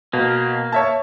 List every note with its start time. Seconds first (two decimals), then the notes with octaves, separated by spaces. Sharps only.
0.13 B2 A#3
0.72 C#5 E5 A5